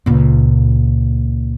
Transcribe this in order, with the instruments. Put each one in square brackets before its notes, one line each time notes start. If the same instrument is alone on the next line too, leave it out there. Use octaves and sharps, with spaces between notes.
[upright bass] C#2 A#2